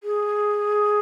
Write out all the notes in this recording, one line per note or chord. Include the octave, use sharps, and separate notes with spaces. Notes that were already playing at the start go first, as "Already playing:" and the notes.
G#4